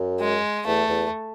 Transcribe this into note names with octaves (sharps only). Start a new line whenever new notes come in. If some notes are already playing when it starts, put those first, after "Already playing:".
Already playing: F#2
G#3
E2 A3
E2